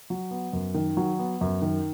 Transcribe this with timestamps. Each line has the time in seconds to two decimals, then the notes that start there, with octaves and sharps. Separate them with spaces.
0.10 F#3
0.31 B3
0.53 F#2
0.74 D#3
0.97 F#3
1.19 B3
1.41 F#2
1.62 D#3